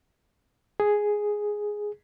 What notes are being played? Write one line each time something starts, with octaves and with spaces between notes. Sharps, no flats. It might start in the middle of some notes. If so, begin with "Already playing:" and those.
G#4